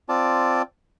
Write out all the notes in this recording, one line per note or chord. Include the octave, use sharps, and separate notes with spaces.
C4 F4 D5 A5